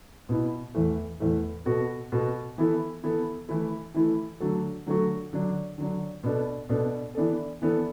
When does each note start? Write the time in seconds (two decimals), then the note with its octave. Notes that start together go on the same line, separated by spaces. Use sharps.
0.29 B2 B3 E4
0.75 E2 E3 A3
1.20 E2 E3 A3
1.65 B2 B3 F#4 A4
2.12 B2 B3 F#4 A4
2.58 E3 B3 E4 A4
3.04 E3 B3 E4 A4
3.49 E3 A3 E4 A4
3.94 E3 A3 E4 A4
4.40 D3 F#3 A3 F#4 A4
4.86 D3 F#3 A3 F#4 A4
5.33 D3 F#3 D4
5.78 D3 F#3 D4
6.23 B2 B3 D4 A4
6.69 B2 B3 D4 A4
7.15 E3 B3 D4 A4
7.62 E3 B3 D4 A4